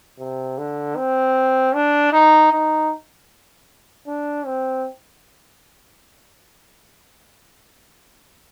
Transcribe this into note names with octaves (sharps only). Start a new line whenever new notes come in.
C3
D3
C4
D4
D#4
D#4
D4
C4